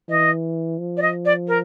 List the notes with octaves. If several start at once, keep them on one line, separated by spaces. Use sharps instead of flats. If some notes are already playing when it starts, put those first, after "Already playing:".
E3 D#5
F3
D5
D#5
D5
A#4